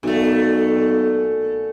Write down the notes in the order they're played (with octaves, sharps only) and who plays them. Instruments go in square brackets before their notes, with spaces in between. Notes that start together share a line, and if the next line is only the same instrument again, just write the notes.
[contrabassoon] B1 [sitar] A#2 A3